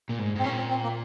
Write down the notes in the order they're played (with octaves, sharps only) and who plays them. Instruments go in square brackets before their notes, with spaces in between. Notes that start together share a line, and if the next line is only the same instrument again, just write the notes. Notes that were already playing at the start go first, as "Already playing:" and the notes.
[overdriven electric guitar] A#2
G#2
G#2
[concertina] C4
[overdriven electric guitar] A#2 [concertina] C#4
[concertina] C4
C4
A#3